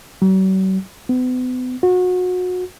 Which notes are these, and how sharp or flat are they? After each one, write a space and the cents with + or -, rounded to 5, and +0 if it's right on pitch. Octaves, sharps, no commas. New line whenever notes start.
F#3 +45
B3 +40
F#4 -30